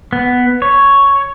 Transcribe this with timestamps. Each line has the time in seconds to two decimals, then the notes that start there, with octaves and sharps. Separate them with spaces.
0.13 B3
0.62 C#5